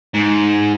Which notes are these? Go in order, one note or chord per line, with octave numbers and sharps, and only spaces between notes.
G#2